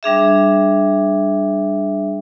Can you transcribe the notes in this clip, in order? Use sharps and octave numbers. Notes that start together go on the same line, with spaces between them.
G3 D4 G#4 E5